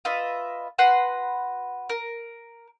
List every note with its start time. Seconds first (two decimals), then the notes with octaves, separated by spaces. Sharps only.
0.05 F4 B4 D#5 E5
0.78 F#4 B4 F#5 C6
1.89 A#4